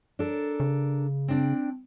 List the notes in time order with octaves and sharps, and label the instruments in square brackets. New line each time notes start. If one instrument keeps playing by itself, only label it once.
[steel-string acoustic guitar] D4 A4 A#4
[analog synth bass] C#3
[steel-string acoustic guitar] C4 D4 G5